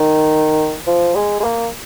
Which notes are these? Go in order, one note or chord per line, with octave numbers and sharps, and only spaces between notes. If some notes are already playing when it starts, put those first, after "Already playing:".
Already playing: D#3
F3
G#3
G#3
A#3